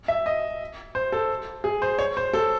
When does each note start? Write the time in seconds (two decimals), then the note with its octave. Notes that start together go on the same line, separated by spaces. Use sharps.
0.08 E5
0.26 D#5
0.95 C5
1.12 A4
1.64 G#4
1.82 C5
1.99 C#5
2.17 C5
2.34 A4